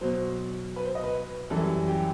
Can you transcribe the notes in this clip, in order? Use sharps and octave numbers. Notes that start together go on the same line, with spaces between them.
B2 F#3 C5
B4
C5
D#5
B4
F#2 E3 G3 A4
G4